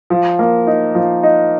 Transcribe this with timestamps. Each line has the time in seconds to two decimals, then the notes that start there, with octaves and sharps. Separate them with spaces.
0.10 F3
0.39 A#3
0.67 D#4
0.95 F3
1.23 D#4